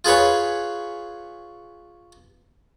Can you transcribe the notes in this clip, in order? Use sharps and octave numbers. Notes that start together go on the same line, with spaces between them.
F4 G#4 B4 C#5